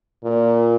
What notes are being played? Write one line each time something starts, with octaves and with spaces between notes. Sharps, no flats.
A#2